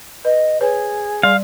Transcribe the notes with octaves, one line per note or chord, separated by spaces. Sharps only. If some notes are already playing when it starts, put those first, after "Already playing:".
B4 D#5
G#4 B4 C#5
G3 D5 F5 C6